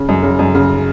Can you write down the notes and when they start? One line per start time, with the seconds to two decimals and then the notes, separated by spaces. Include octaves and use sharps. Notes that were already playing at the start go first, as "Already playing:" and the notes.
Already playing: C#3
0.09 F#2
0.23 C#3
0.39 F#2
0.55 C#3